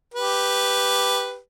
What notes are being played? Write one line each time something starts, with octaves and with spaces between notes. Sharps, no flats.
G4 B4